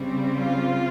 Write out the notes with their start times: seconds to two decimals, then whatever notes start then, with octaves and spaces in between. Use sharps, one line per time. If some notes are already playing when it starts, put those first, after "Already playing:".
Already playing: C#3 G3 C4
0.36 F4